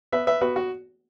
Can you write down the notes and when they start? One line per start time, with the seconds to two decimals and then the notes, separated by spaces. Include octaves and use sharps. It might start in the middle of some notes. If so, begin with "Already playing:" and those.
0.12 B3 B4 E5
0.27 B4 E5
0.41 B3 F#4 B4
0.56 F#4